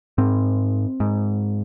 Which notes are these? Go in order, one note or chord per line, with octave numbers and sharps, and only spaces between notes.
G#2 C4
G#2